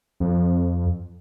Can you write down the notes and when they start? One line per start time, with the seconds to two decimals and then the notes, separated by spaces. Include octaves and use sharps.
0.20 F2